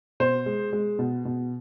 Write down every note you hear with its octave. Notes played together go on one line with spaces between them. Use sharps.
B2 C5
G#3
G#3
B2
B2